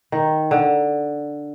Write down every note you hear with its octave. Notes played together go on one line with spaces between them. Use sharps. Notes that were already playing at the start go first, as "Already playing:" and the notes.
D#3
D3